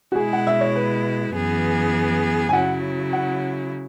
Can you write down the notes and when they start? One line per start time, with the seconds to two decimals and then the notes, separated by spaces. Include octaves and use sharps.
0.12 F#4
0.15 B2 G#3 E4 G#4
0.33 F#5
0.47 E5
0.61 C#5
0.75 B4
1.34 F#2 E3 B3 G#4
2.49 G#5
2.53 C#3 F#3 E4 F#5
3.13 F#5